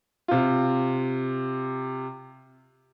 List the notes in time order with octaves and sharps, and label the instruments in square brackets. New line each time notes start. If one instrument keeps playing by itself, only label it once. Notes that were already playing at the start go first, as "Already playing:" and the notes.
[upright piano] C3 F4